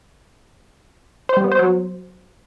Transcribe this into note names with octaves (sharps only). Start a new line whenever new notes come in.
C5
G3
B3
C5
F#3